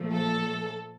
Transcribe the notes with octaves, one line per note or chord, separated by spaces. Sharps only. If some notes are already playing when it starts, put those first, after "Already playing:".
Already playing: A#2 F3 A3
A4